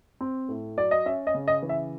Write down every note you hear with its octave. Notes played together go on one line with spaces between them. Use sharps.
C4
A2
F#3 D5
D#5
C#4 E5
D#5
C#3
D#5
E3
E5